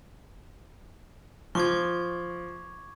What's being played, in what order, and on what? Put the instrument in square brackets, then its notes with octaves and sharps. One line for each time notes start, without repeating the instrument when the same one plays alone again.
[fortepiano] F3 [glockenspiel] C#6 D6 G#6